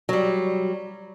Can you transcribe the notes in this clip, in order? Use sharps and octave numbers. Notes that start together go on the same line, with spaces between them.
F#3 G3